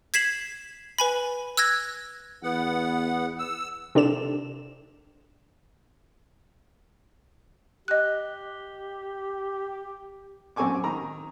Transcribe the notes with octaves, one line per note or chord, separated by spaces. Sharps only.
G#6 B6 C7 E7 F#7
B4 G#5 B5
E6 F#6 G#6 A#6
E2 B3 F#5
E6
C3 D4 A4 E7
G4 D#5 F#6
F#2 C4 A4 G#5 C#6 D6
D#3 A#5